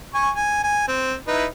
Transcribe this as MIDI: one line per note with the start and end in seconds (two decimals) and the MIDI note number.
0.14 0.30 80
0.14 0.30 85
0.36 0.63 80
0.64 0.86 80
0.88 1.13 60
1.28 1.45 63
1.28 1.45 64
1.28 1.45 71